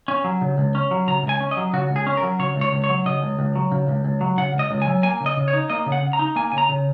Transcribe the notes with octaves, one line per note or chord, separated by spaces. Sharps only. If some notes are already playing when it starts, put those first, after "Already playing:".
C#4
F#3
C#3
C#2
C#4
F#3
C#3 A#5
C#2
G#5
C#4
D#5
F#3
C#3 F#4
C#2
G#4
C#4
A#4
F#3
C#3 C#5
C#2
C#5
C#2
C#5
F#3
C#3 D#5
C#2
C#2
F#3
C#3
C#2
C#2
F#3
C#3 F#5
C#2
D#5
C#2
G#5
F#3
A#3 G#5
C#3
D#5
C#3
C#5
D#4
A#3 D#5
C#3
F#5
C#3
A#5
D#4
A#3 G#5
C#3 G#5
A#5
C#3